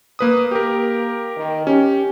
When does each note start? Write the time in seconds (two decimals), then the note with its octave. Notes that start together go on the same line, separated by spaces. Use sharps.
0.19 A#3 B4 D#6
0.51 A#3 G4 A#4
1.37 D#3
1.67 C#4 G4